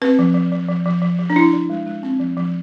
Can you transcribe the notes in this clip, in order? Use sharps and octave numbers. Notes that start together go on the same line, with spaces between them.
C4 B4
F3
F3
F3
F3
F3
F3
F3
D4
F3 E4
F3
G#3
G#3
C4
F3
F3